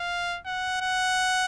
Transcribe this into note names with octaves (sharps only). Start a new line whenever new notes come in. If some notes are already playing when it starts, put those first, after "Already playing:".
Already playing: F5
F#5
F#5